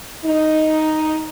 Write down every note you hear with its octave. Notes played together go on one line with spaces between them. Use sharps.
D#4